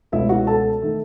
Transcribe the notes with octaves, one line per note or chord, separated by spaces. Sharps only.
C#2 B2 A3 C#4 E4 E5
F#4 F#5
A4 A5
D#3 A3